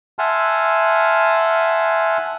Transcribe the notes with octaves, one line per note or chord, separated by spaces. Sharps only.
E5 F#5 G#5 A5 C6 F6